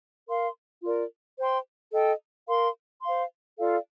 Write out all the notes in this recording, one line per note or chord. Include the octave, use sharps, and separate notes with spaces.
A#4 F5 C6
F4 A#4 D5
C5 G5 C6
A4 D#5 G5
A#4 F5 C6
C5 F5 C6
F4 A4 D5 F5